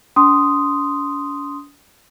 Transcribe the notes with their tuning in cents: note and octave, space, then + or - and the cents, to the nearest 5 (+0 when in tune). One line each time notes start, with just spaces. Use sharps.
D4 -45 C6 -5 D#6 +0